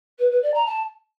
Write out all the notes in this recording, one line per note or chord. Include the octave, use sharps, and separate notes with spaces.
B4
B4
D5
A#5
A5